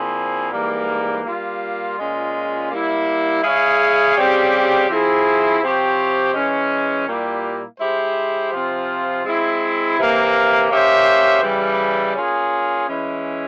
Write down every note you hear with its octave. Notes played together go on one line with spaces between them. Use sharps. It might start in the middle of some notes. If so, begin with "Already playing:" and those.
Already playing: A#2 F3 C4 E4 G#4
G#2 E3 G3 A#3
G3 A#3 F4
A#2 G#3 C#4 F4 G#4
G3 A#3 E4
G#3 E4 G#4 C#5 F5
C#3 G3 C4 G4
F3 C4 E4 G#4
C3 F3 C4 G4 C#5
E3 G#3 C#4
A#2 G3 A#3 E4 G4
G#3 E4 G4 C5
C3 F3 C4 F4
G#3 C4 E4
C3 E3 A#3
A#3 C#4 G4 C5 E5
C#3 E3 G3
A#3 C#4 F4 G#4
E3 G#3 C#4 E4